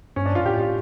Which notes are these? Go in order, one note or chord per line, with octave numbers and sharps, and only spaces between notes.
G2 C#4
D4
G2 F4
A2 G4
F4